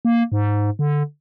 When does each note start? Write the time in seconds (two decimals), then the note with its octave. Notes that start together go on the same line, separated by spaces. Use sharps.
0.05 A#3
0.32 G#2
0.79 D3